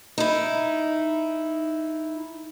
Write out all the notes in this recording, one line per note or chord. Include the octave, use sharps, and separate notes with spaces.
D#4 E4